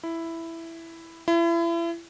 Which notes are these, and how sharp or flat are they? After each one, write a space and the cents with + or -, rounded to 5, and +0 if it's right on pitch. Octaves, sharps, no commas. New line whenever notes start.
E4 +5
E4 +35